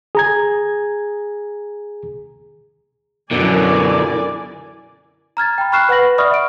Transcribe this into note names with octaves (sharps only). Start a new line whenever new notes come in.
G#4 A#5 G#6
F#2 B2 D3 E4 A#4 D5 G#5
A#5 F6 G#6 A6
G5 B5
B5 C#6 F6 F#6 C7 E7
B4 F#5 B5 A#6 F#7
D5 E5 B5 C#6 D#6 F6
E5 D7